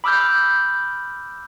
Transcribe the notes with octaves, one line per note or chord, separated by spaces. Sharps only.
B5 D6 E6 F6 G6